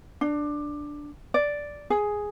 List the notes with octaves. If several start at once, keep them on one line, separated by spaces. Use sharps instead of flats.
D4
D5
G#4